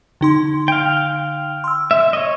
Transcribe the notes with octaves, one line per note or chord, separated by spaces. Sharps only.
D3 D#4 C6
F5 G5
C6 E6
E5
C#5 D#5